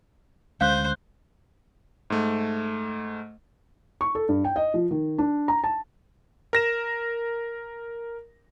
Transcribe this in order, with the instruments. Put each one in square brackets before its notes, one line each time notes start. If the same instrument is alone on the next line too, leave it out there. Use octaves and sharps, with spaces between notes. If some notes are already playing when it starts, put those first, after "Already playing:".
[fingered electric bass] D2 G#3 C#4 [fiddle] C5 [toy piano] F5 [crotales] F#6 G6
[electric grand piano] G#2 A3
[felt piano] C#6
A4
G2
G5
D#5
F3
D#3
D4
A#5
A5
[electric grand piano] A#4 A#6 E7